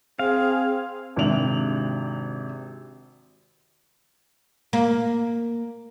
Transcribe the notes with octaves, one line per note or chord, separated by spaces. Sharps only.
C4 G#4 F5
G#1 C3 D4 F7 F#7
A#3